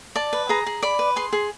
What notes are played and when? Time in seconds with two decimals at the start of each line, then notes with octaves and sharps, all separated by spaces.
0.16 D5 A5
0.33 B4
0.49 G#4 A#5
0.67 G#4
0.83 D5 B5
0.99 B4
1.16 G#4 C6
1.33 G#4